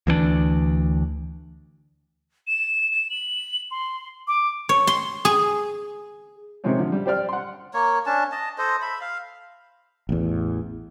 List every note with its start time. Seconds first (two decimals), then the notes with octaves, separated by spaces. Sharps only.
0.07 D2 E3 A#3 D4
2.47 E7
2.91 E7
3.10 F#7
3.71 C6
4.28 D6
4.69 C#5
4.87 C6
5.25 G#4
6.64 C3 D#3 F3 G#3 C4 C#4
6.79 D3 F3
6.92 G3
7.06 G4 C5 D5 F6
7.29 F#5 C6
7.74 A#3 C#5
8.06 C#4 D4 A5
8.32 D#5 A5
8.58 A4 C5 D#5
8.82 E5 B5
9.01 F5
10.09 A1 E2